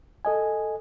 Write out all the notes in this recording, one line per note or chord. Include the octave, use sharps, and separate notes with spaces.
A4 D#5 G#5